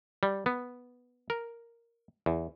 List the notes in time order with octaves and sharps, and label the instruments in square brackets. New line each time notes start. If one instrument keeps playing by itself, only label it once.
[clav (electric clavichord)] G3
B3
A#4
E2